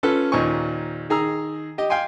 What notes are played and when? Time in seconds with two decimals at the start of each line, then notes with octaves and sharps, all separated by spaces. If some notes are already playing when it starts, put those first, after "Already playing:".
0.03 C#4 F4 A4 B4
0.32 D#2 A#2 C5 G#5 C#6
1.10 D#3 G#4 A#5 E6
1.78 G4 D#5
1.90 F5 G5 G#5 C6